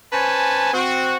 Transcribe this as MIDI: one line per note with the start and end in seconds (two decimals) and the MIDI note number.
0.13 0.72 61
0.13 0.72 71
0.13 0.72 72
0.13 0.72 80
0.13 0.72 81
0.73 1.17 60
0.73 1.17 66